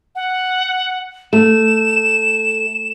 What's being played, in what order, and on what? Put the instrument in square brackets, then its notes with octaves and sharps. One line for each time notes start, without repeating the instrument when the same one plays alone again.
[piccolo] F#5
[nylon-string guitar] A3 [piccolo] E7